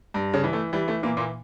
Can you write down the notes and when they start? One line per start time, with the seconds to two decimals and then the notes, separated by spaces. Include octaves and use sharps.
0.14 G2
0.34 C#3 C#4
0.44 E3
0.53 A3
0.73 E3 G3
0.88 A3
1.03 A#2 E3 A#3
1.17 A#2 A#3